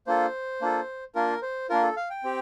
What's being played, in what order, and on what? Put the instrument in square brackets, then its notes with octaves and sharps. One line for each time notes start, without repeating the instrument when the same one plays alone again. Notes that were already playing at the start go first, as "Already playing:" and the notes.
[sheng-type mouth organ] A#3 D4 F4 A4 C5
A#3 D4 F4 A4
A#3 D4 F4 A#4
C5
A#3 D4 F4 A#4
A4
F5
G5
C4 G4